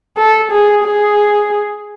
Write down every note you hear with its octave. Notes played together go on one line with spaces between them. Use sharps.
A4
G#4
G#4